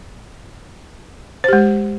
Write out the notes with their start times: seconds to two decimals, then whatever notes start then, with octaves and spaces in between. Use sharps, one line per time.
1.44 C5
1.48 G4
1.53 G#3